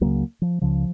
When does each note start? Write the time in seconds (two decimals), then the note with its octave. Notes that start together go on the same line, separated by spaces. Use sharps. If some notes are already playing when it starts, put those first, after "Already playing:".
0.01 C#2 C#3 F#3 A#3
0.42 F3
0.61 C#2 C#3 F3